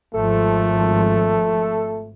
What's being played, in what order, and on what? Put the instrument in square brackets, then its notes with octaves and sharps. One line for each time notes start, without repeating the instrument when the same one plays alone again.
[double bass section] G#1 F3 [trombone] A3 [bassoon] A4